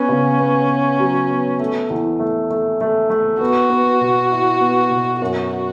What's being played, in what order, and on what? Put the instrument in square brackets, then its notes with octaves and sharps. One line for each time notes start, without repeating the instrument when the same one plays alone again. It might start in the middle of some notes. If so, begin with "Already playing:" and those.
Already playing: [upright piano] B3 [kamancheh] C#4
[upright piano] C#3
B3
B3
F#3
B3
A3
E2
A3
A3
A3
A3
[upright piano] B3 [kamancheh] F#4
[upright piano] B3
B2
E4
B3
B2
[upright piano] F#2 [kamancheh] F#4